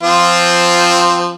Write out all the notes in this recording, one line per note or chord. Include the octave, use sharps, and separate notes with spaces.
F3 C4 F4